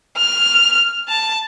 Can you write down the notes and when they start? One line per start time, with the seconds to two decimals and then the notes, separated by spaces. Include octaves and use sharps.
0.18 F6
1.09 A5